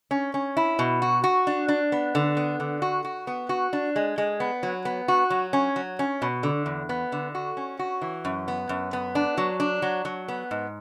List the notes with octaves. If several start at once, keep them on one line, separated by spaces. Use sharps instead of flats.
C#4
C#4
E4
B2
F#4
F#4
D4
D4
B3
D3
B3
D3
F#4
F#4
B3
F#4
D4
G#3
G#3
B3
F#3
B3
F#4
F#3
C#4
F#3
C#4
B2
D3
E2
B3
D3
F#4
C#4
F#4
E3
F#2
B3
F#2
B3
D4
F#3
D4
F#3
F#3
B3
G#2